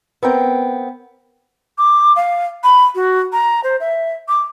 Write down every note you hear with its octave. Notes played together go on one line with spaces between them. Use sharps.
B3 C4 A#4 G5
D6
F5
B5
F#4
A#5
C5
E5
D6